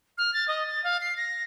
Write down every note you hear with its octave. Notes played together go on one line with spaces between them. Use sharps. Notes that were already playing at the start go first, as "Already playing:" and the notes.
F6
A6
D#5
A6
F5
C7
A#6